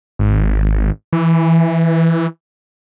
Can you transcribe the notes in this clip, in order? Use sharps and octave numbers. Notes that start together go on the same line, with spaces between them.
G#1
E3